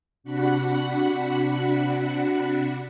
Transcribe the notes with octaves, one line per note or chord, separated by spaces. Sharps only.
C3 D4 F#4 F#5 B5